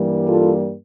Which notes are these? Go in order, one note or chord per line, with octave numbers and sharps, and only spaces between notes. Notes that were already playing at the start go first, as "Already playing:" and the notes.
Already playing: G2 E3 G3 A#3
F4 A4